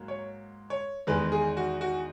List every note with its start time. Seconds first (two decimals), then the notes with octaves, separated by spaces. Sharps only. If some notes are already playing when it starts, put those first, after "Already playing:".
Already playing: G#2 F#3 A#3
0.08 C#5
0.70 C#5
1.07 E2 D#3 G#3 B4
1.32 G#4
1.57 F#4
1.81 F#4